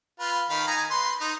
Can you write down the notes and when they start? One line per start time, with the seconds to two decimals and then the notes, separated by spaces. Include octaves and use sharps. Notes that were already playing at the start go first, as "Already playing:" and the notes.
0.20 F4 B4
0.50 D#3 F5 B5
0.67 D#4 G#5 A#5
0.91 B4 C6
1.20 D#4